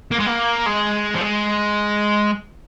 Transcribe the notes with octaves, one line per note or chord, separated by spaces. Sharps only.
A#3
G#3
A#3
G#3
F3
G#3